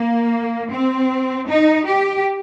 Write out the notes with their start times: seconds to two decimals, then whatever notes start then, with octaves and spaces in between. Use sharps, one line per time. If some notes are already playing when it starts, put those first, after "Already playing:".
Already playing: A#3
0.71 C4
1.48 D#4
1.86 G4